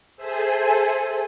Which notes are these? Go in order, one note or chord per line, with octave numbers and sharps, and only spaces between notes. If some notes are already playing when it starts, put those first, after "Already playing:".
G#4 A4 C5 E5 G#5 A5